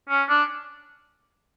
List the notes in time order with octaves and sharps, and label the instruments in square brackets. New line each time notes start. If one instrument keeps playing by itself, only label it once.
[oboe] C#4
D4